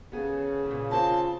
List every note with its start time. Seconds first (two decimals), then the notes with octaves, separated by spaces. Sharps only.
0.12 C#3 B3 G#4 A4
0.66 A#2 E3
0.91 A#3 C4 F4 A5